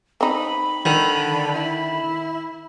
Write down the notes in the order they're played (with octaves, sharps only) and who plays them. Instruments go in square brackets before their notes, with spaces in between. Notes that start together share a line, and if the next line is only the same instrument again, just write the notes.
[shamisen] C4 D#4 [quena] B5
[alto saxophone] D3 [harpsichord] D#3
[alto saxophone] E4